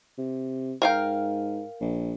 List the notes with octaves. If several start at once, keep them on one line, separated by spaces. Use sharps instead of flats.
C3
G#2 A#4 F5 G5
A#1